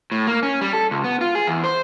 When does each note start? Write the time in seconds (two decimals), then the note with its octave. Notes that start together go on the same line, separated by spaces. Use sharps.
0.12 A2
0.27 A#3
0.43 C#4
0.61 G3
0.73 A4
0.91 C#2
1.04 B3
1.21 F4
1.35 G#4
1.47 E2
1.64 C5